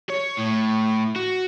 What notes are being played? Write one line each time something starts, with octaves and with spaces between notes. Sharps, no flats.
C#5
A2
F#4